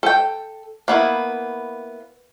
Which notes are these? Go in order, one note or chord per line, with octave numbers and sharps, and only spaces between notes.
A4 G5
A#3 B3 E4